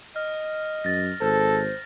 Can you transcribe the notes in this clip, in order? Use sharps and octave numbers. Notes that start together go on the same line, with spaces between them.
D#5 F6
F#2 A6 A#6
G#1 A4 C5